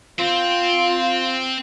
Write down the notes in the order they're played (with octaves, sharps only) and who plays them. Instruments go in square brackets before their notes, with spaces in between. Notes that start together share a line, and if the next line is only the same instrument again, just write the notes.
[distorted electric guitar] C4 [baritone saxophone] F4